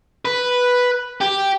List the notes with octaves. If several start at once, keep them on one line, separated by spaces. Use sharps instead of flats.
B4
G4